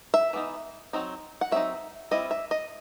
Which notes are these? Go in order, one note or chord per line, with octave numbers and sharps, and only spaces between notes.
E5
E3 B3 D#4
F#3 C4 D#4
F#5
F#3 C4 D#4 E5
G3 C4 E4 D#5
E5
D#5